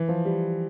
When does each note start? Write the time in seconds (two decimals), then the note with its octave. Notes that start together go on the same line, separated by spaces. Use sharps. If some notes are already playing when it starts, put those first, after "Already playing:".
Already playing: E3
0.09 F3
0.25 G3